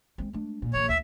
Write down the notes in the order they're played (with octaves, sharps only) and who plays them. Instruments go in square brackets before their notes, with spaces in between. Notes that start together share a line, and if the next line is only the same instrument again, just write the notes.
[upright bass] G#3 C4
A3 D4
A#2
[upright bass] A#1 D#3 [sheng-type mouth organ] C#5
[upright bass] D2 [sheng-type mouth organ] E5